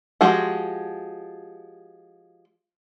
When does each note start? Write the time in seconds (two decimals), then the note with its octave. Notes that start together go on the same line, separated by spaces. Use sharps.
0.21 F3 G#3 F#4 G4